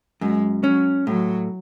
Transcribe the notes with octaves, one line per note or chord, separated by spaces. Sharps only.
F#2 G#3
F#3 C#4
A2 F#3